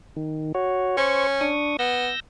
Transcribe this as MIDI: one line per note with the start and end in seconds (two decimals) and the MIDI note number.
0.16 0.52 51
0.55 0.97 66
0.55 0.97 73
0.97 1.52 61
0.97 1.27 72
0.97 1.27 85
1.41 1.77 62
1.41 1.77 85
1.41 1.77 87
1.79 2.10 59
1.79 2.20 88
1.79 2.20 91
1.79 2.20 94